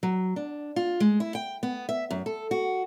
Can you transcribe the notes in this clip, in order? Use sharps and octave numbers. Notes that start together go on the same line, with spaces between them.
F#3
D4
F4
G#3
E4
G5
B3
E5
F#2
A4
F#4